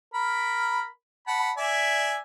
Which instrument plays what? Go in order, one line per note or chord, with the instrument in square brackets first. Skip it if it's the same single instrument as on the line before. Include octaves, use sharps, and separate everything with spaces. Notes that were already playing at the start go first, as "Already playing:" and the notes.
[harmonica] A#4 B5
F#5 A5 B5
D5 E5 G#5